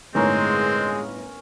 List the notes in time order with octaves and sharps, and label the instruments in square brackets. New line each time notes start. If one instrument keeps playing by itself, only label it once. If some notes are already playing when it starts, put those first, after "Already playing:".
[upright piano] G1 A2 D#4 [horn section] G#3 [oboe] C4 [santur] C#4 A#4